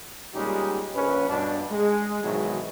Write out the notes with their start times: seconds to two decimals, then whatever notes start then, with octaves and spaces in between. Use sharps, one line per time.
0.35 A#2 G3 G#3 C#4 D#4 G4
0.96 A#1 C#4 B4
1.29 G2 B2 D4
1.71 G#3
2.24 G#2 B2 D#3 E3 F#3 G#3